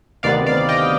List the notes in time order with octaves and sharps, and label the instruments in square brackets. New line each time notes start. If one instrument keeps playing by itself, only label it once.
[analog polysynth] D2 C3 D#3 B3 D5 F5
D5 F5
D#5 G5